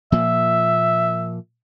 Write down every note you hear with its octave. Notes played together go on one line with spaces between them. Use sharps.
A#2 F3 A#3 E5